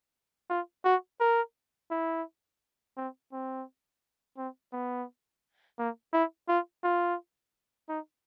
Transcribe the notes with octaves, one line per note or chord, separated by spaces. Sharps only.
F4
F#4
A#4
E4
C4
C4
C4
B3
A#3
E4
F4
F4
D#4